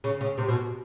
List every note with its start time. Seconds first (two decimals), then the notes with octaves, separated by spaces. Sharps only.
0.04 C#3
0.21 C#3
0.38 C3
0.48 B2